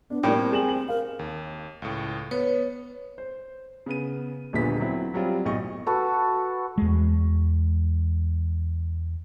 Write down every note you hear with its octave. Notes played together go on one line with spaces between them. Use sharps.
B3 D4
A2 G3 A#3 D5 G5
C4
G#4 E7 F#7
F#7
A#4 F5
D#2
C#2 A2
B3 B4 C#5
C5
C#3 B3 D#7
D#1 A#1 A#2 D3 B3 B6
F#3 C4 E4
F#3 G3 C4 F4
B1 A2 D#5 C#6
F#4 A4 B4
E2 G#3